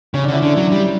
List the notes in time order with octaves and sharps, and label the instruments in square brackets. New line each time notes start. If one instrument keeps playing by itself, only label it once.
[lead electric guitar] C#3 [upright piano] C#4
[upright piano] D4
[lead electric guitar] D3 [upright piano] C#4 E4
[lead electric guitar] D3 [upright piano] D4
[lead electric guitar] F#3
G3